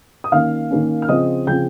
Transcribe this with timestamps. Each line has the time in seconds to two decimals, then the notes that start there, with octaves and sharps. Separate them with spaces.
0.24 D#6
0.32 D#3 A#3 C#4 F5 F6
0.71 D#3 A#3 C#4
1.02 F6
1.09 C#3 F3 C4 D#5 D#6
1.47 C#3 F3 C4 G5 G6